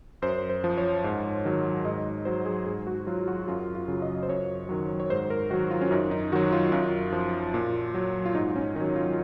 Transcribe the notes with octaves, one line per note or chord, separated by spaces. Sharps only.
F#2 C5
C5
F3
C#5
G#2
D#3 F#3
G#2 D#5
F#3 C5
G#4
G#2 G#4
F#4
F#3 F4
F#4
F#2 F4
F4
C#3 F#3
D#5
C5
F#2 C#5
D#3 F#3
C#5
G#2 C5
A#4
D#3 F#3 F#4
F4
C#4
F#2 D#4
D#4
D#3 F#3 F#4
F4
F#2 F4
F3
A#2
F#3
F4
G#2 D#4
C#4
D#3 D#4
F#3
F4